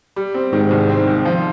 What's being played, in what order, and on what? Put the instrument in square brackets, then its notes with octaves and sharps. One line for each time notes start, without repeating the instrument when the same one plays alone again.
[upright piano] G3
C4
[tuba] G#2 [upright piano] D#3
[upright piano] C2
C4
D#3
F3